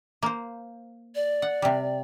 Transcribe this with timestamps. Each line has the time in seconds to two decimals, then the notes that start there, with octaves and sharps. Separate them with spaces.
0.23 A#3 C5
1.15 D5
1.42 F#5
1.62 C3 G3